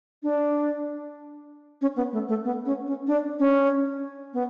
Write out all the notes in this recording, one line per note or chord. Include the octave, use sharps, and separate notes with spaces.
D4
C#4
B3
A3
A3
B3
C#4
C#4
D4
C#4
B3